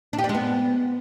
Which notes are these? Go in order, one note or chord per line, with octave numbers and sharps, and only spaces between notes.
D4
G4
D4
G#3
B3